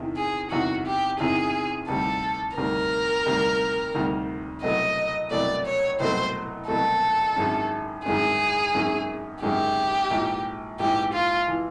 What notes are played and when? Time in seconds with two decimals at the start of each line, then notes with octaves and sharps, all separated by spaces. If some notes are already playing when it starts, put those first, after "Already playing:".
Already playing: E2 C3 D#3
0.17 G#4
0.51 E2 C3 D#3 F#4
0.86 G4
1.20 E2 C3 D#3 G#4
1.88 D2 C3 D#3 G3 A4
2.57 D2 C3 D#3 G3 A#4
3.26 D2 C3 D#3 G3
3.95 D2 C3 D#3 G3
4.63 C2 B2 F#3 A3 D#5
5.31 C2 B2 F#3 A3 D5
5.66 C#5
6.00 C2 B2 F#3 A3 C5
6.68 C2 B2 F#3 A3 A4
7.36 G#1 F#2 D#3 G#3 C#4
8.05 G#1 F#2 D#3 G#3 C#4 G#4
8.74 G#1 F#2 D#3 G#3 C#4
9.42 G#1 F#2 D#3 G#3 C#4 G4
10.11 A#1 G#2 E3
10.79 A#1 G#2 E3 G4
11.13 F4
11.48 E3